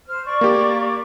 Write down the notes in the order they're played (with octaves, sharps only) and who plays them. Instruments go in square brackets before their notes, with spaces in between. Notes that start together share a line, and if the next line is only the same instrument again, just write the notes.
[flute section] C5 F6
D5 C#6
[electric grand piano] A#3 G4